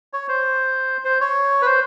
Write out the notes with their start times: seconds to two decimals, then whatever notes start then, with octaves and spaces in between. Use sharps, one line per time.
0.13 C#5
0.29 C5
1.04 C5
1.21 C#5
1.62 B4
1.66 C5